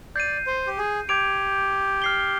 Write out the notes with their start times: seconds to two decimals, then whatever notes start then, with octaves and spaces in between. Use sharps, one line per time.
0.16 D5 G6 C7 D#7
0.47 C5
0.67 G4
0.78 G#4
1.09 G4 D6 G#6 D7 F7
2.02 F6 C7 G7